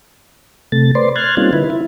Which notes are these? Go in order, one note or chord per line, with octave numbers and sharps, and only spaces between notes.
C3 A3 A6
B4 C5 D5 C6
C6 F6 F#6 G#6 A6
G3 A#3 C4 C#4 D#4 F4
D3 E4 B4
E4